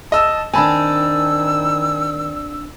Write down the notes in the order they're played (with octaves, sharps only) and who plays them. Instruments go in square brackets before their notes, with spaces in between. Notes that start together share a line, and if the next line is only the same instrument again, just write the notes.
[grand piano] D#5 E6 [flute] A5
[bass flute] D#3 [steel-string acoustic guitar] C4 D4 [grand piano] G#5 A5 B5 [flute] E6